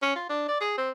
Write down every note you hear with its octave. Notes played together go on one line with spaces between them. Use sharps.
C#4
F4
D4
D5
G#4
C4